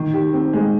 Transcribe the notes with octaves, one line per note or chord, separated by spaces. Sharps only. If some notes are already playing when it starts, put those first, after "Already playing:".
Already playing: D#3
G4
C4
G#3